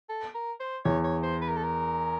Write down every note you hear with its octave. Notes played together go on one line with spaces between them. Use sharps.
A4
A#4
C5
E2 C#5
C#5
C5
B4
A#4
A4
A#4